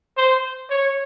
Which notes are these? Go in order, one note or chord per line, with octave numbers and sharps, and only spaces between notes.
C5
C#5